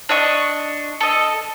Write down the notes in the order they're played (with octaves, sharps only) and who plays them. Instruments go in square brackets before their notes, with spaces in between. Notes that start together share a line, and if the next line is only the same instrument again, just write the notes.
[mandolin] D4 D#5 C#6
A4 D#5